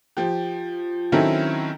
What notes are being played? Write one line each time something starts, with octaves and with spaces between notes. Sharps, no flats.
F3 G4
D#3 F#3 C4 C#4 E4 A4